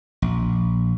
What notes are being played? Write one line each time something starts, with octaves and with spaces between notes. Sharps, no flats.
A#1